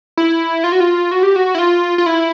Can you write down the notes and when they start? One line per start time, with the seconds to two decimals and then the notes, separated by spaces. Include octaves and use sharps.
0.17 E4
0.64 F4
0.72 F#4
0.80 F4
1.11 F#4
1.23 G4
1.36 F#4
1.55 E4
1.58 F4
1.98 F4
2.06 E4